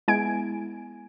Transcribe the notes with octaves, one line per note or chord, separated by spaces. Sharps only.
G#3 B3 E4 G#5 G#6 D7